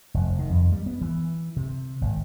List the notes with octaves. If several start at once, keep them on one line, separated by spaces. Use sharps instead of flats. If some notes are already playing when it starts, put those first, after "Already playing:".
F1
D#3
F2
G3
B3
E3
C3
G#1